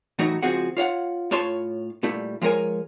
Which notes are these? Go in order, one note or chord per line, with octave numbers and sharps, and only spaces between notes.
A2 E3 F#3 A3 D#4 F#4
C#2 F3 C4 F#4 G#4 F#5
F4 C#5 F5 F#5
A2 F4 C#5 A5 C6
A#2 G3 A3 E4
F3 G#3 B3 A#4 C#5 G#5